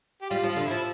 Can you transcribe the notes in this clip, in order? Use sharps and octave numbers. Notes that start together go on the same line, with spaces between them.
G4
G3 F4
F3
F4
D3
F3 E4